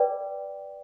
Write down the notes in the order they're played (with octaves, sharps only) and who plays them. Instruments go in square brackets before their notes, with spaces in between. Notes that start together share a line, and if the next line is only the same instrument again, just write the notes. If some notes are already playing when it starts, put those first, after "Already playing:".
Already playing: [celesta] B4 D5 G5